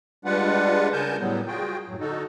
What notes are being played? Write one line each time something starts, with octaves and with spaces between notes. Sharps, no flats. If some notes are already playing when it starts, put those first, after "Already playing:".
G3 G#3 D4 F4 B4 F#5
C#3 A#4 G#5 A5 G6
A2 F#3 G3 B3
F4 F#4 G#4 G5
F#2 A2 F#3
D3 D#4 F#4 A4